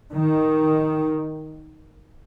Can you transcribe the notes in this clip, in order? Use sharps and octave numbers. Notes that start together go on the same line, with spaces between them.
D#3